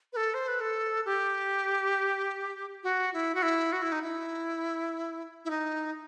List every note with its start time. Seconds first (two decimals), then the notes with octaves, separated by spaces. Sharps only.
0.13 B4
0.16 A4
0.34 C5
0.48 B4
0.61 A4
1.05 G4
2.83 F#4
3.14 E4
3.35 F#4
3.43 E4
3.72 F#4
3.82 E4
3.92 D#4
4.02 E4
5.45 E4
5.50 D#4